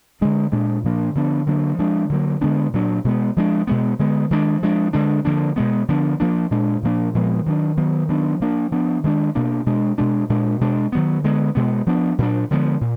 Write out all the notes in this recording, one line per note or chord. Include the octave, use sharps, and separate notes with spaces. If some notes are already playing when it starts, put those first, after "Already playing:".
D3 G#3 D4
A#2 G#3 D4
A#2 F3 A#3 D4
D3 F3 B3 D4
D3 F#3 A#3 D4
F3 G#3 D4
D3 F#3 A#3
D3 G#3 B3 D4
A#2 F#3 D4
B2 G#3 B3
F3 G#3 D4
B2 G#3 B3
D3 G#3 B3
D#3 G#3 B3 D4
F3 G#3 D4
D3 G#3 D4
D3 F3 A#3 D4
B2 G#3 B3
D3 F3 B3 D4
F3 A#3 D4
A#2 G#3 D4
A#2 F3 A#3 D4
A#2 F3 G#3 B3
D#3 F#3 D4
D#3 F#3 B3
D#3 F#3 B3 D4
F3 A#3 D4
F3 B3 D4
D#3 G#3 D4
B2 A#3 D4
B2 G#3 D4
B2 G#3 D4
A#2 G#3 D4
B2 G#3 D4
D#3 F#3 B3
D3 G#3 B3
B2 G#3 B3
F3 B3 D4
A#2 F#3 D4
D3 F3 G#3 B3
A#2